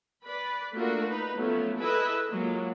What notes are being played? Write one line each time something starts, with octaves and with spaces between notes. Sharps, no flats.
B4 D5 B5
A3 A#3 D4 F4 F#4 A#4
D#4 B4
F3 F#3 A3 B3 C#4
E4 G#4 A4 B4 D#5 E5
F#3 G#3 A#3 F4